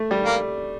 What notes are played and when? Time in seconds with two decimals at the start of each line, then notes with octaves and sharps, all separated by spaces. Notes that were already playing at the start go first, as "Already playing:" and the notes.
Already playing: A3
0.11 G3
0.26 A#3